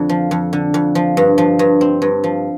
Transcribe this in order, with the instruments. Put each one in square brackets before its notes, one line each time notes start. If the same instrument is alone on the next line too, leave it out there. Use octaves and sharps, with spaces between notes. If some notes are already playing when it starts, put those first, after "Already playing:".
Already playing: [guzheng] F2 D3
F3
F2
D3
F2
F3
G2
F3
G2
C4
G2
F3